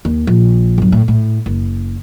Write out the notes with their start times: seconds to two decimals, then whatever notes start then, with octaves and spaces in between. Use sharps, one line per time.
0.05 D#2
0.27 A#1
0.78 G1 F#3
0.92 A2
1.08 A2
1.46 F#1